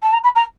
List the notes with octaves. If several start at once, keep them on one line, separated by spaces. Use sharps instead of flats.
A5
A#5
B5
A#5